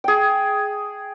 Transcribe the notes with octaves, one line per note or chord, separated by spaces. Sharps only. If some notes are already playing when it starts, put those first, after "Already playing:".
G#4 G5